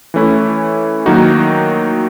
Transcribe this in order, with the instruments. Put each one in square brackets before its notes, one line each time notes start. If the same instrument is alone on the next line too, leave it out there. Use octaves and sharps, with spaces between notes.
[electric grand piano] E3 A3 C#4 E4
D#3 F#3 A#3 D#4 F#4